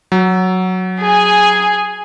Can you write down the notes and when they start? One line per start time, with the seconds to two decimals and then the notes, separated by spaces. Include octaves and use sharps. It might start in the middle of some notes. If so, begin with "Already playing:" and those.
0.12 F#3
1.00 G#4 G#5